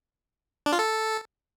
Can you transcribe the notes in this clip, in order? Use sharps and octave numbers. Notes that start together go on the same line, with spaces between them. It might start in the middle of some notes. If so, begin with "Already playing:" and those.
D4
F4
A4